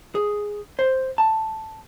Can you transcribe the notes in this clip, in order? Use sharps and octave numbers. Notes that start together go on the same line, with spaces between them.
G#4
C5
A5